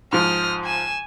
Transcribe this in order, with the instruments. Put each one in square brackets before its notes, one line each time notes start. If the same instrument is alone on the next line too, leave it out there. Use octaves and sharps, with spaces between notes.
[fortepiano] G#2 F3 [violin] D#6 F6
[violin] G#5 E7